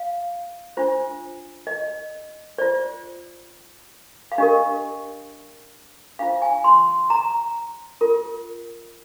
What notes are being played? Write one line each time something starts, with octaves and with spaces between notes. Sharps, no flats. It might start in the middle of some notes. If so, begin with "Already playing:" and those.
Already playing: F5
D4 F4 C5
D#5
F4 C5 D5
F5
D4 G4 A#4 D#5
D4 F4 C5 F5
G#5
C6
A#5
F4 A#4